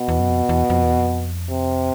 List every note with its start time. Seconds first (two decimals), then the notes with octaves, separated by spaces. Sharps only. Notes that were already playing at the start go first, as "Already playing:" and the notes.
Already playing: B2
0.08 E2
0.20 F#2
0.28 F2
0.49 E2
0.70 F2
0.83 E2
0.97 F2
1.50 C3